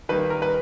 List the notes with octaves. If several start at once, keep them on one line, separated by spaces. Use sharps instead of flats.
D#3 G3 A#3 B4
A#4
B4